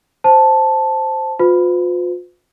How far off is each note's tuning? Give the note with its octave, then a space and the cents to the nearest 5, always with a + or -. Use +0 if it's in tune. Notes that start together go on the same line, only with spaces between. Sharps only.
C5 +0 A5 +0
F4 +40 B4 +45